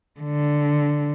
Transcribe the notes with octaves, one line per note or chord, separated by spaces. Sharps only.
D3